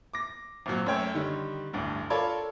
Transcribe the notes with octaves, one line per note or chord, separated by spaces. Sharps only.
D6 A#6
G#1 A#2 F#3
F#2 A3 C#5 G5
D3 D#3 G3
A1 D2 G2
F4 A4 A#4 C#5 D5 B5